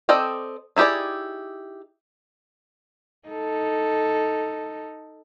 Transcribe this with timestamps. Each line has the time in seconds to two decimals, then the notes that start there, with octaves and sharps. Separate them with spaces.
0.09 C4 A4 D5 D#5 G5
0.76 D#4 E4 G4 G#4 D5
3.29 D#4 A4